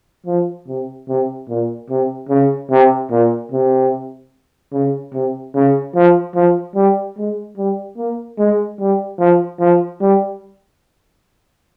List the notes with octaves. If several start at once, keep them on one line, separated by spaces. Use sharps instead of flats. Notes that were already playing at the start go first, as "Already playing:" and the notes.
F3
C3
C3
A#2
C3
C#3
C3
A#2
C3
C#3
C3
C#3
F3
F3
G3
G#3
G3
A#3
G#3
G3
F3
F3
G3